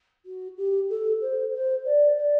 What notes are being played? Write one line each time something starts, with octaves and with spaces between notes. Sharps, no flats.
F#4
G4
A4
C5
C5
D5
D5